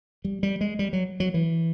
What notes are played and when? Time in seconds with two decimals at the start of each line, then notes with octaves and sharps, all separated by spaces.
0.24 G3
0.43 G3
0.61 G#3
0.79 G3
0.93 F#3
1.20 F#3
1.34 E3